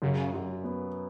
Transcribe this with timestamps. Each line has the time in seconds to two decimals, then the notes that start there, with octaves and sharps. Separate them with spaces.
0.02 F#2 C#3
0.34 F#2
0.64 B3